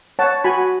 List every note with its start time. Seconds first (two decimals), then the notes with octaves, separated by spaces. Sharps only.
0.19 C#5 F#5 A5
0.44 F#4 G#5 B5